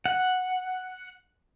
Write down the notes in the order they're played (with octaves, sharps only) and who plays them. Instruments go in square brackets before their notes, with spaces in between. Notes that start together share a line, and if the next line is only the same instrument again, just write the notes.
[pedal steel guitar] F#5